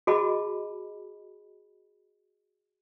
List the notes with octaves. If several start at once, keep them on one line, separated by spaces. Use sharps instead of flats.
F#4 G#4 D#5 A5 B5